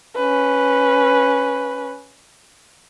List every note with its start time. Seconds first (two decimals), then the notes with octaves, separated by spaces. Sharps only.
0.16 C#4 B4